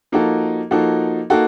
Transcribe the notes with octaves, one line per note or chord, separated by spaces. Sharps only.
F3 A#3 D#4 F#4 A4
F3 A#3 D#4 F#4 A4
A#3 D#4 F#4 A4